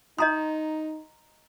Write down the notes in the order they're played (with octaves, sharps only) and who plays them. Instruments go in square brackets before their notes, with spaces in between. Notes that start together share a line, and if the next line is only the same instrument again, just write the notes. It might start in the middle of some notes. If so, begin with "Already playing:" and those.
[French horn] D#4 [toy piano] D#5 A#5 C6 [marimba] D#6 G6